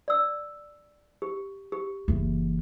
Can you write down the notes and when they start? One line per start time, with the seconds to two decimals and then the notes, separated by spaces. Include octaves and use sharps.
0.08 D5 E6
1.22 G4
1.72 G4
2.08 F#1 E3